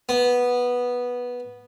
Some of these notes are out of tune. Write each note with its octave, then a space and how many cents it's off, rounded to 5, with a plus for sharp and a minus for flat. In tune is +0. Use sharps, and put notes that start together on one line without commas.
B3 -10